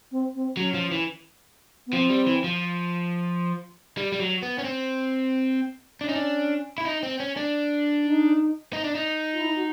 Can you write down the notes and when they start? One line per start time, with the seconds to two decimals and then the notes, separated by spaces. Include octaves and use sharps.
0.11 C4
0.35 C4
0.56 F#3 C#4
0.74 F3
0.91 E3
1.86 B3
1.93 F3 C4
2.10 G3
2.27 E3
2.44 F3
3.97 G3
4.12 G3
4.20 F#3
4.42 B3
4.58 C#4
4.64 C4
6.01 C#4 D4
6.09 D#4
6.16 D4
6.78 E4
6.85 D#4
7.03 C4
7.20 C#4
7.37 D4
8.05 D#4
8.73 D#4
8.84 D4
8.95 D#4
9.33 F4
9.40 E4
9.56 F#4